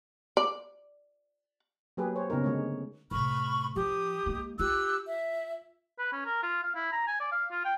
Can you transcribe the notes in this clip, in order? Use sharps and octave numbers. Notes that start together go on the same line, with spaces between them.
D5
F#3 A#3 G4 G#4 B4
G#4 C5 C#5
C#3 B3 D#4 A#4
D3 G#3 A3 D4 C#5
A2 C3 B5 C#6 F6
F3 G4 D#6
G#3 A#3
F4 G4 E6 F#6
E5
B4
C#4
A#4
F4
F5
E4
A#5
G#5
D5
F5
F4
G5